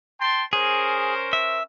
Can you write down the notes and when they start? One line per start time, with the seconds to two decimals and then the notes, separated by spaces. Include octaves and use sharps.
0.19 G5 A5 C6
0.53 C#4 G#4 A#4 C5
1.33 E5